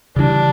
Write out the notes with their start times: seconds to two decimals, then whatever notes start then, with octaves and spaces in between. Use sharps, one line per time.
0.16 C#3 E3 G3 D4